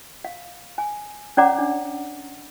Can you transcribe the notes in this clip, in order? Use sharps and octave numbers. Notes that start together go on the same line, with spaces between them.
F5
G#5
C#4 C#5 D5 F#5 A#5 D6
D4